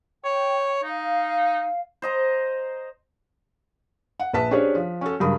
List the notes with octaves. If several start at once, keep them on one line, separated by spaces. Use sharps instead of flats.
C#5 G5
D#4 F5
C5 D#5 A#5
F#5
A#1 B4 A5 B6
C#4 D4 G4 G#4 C5 C#5
F3
C#4 F#4 A4
G2 C#3 F#3 A#4 B5 D#6